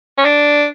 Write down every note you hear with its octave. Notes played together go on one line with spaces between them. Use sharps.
C#4
D4